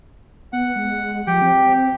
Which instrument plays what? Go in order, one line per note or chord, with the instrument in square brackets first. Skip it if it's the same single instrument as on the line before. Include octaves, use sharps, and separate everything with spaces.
[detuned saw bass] B3 [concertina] F#5
[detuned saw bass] G#3
[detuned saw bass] F3 [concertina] G4 G5
[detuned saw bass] C4